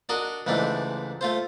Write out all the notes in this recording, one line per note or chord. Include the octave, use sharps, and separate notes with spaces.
D4 F#4 A#4 D#5
C#2 G#2 E3 A3 D4
A3 F4 C5